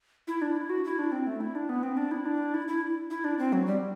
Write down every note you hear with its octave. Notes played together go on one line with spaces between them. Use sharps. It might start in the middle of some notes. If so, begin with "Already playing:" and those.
E4
D4
E4
F#4
E4
D4
C4
A3
E4
D4
B3
C4
D4
E4
D4
E4
E4
E4
D4
C4
F#3
G3